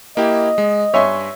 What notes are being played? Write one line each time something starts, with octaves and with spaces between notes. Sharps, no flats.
A#3 E4 G4 D#5
G#3
G2 C#5 E5 G#5 C6